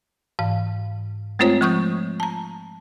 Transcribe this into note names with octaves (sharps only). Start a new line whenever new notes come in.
G#2 E3 F5
G#3 A3 C4 F4 C5 C#5
F3 G#3 C#6 D#6 G6
A5 A#5